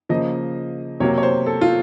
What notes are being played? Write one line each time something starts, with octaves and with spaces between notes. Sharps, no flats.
C#3 F3 A#3 D#5
C3 F#3 A#3 C#5
C#5
C5
A4
F4